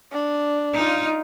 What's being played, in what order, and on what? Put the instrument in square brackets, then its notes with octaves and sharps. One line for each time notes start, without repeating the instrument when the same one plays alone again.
[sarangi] D4
[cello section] D#4 F4